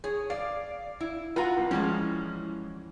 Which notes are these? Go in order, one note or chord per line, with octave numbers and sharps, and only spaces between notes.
G#4 C#5
D5 F5
E4
F4 F#4 B4 F#5 A#5
C2
E3 F3 G3 G#3 C#4